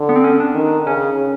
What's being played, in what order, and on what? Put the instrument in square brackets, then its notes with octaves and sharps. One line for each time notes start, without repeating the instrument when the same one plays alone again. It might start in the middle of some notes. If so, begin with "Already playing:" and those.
Already playing: [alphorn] D3
[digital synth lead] B3
C4
C#4
D4
[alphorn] D#3
[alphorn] C#3 [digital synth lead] C#4